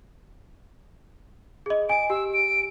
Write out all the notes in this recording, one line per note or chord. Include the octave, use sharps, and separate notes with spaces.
G#4 D#5
D#5 G#5 D7
G4 E6
D7